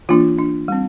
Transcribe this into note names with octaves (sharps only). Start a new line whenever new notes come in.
E3 A#3 D4 F4
D4
G3 C4